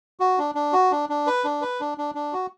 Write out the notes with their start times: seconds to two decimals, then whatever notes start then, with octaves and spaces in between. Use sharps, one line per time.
0.20 F#4
0.38 D4
0.55 D4
0.73 F#4
0.91 D4
1.09 D4
1.27 B4
1.44 D4
1.61 B4
1.80 D4
1.98 D4
2.15 D4
2.33 F#4